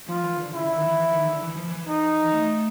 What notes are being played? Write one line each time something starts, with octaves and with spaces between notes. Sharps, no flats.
F3 F4
E3
D3
C#3 E4
D3
D#3
E3
E3
D#3
D3
E3
F3
E3
D#4
A3